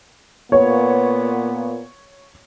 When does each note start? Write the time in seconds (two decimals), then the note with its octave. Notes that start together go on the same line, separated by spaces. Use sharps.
0.52 A#2 B3 C#5